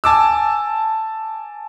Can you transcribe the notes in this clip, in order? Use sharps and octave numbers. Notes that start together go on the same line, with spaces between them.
G#5 A5 D6 E6